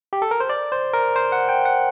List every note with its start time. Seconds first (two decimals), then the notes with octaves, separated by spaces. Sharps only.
0.13 G4
0.22 A4
0.31 A#4
0.40 C5
0.49 D5
0.72 C5
0.93 A#4
1.16 C5
1.32 F#5
1.49 G5
1.65 F#5